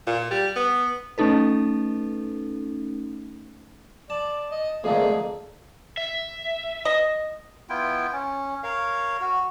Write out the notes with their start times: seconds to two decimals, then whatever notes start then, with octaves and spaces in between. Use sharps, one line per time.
0.07 A#2
0.31 G3
0.56 B3
1.18 A3 C#4 D#4 A4 B4
4.10 D5 A5
4.52 D#5
4.84 F2 G#2 D3 A3 A#3 G#4
5.97 E5
6.85 D#5
7.69 B3 E4 F4 G5
8.12 C#4
8.63 A#4 C#5 F5
9.20 F#4